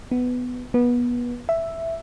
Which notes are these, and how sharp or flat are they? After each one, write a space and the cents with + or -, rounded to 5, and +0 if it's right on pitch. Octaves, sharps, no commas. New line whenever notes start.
B3 +10
B3 -25
E5 +5